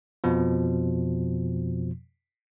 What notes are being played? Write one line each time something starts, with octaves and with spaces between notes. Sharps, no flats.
F2 B2 F3